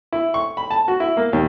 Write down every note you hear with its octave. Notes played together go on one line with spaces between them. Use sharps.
E4
C#6
B5
A5
F#4
E4
A#3
D#2